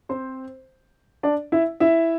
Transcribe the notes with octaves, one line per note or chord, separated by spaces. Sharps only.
C4 C5
D4 D5
E4 E5
E4 E5